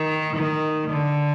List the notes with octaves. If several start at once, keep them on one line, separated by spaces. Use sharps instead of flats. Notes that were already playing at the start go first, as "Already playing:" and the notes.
Already playing: D#3
D#3
D3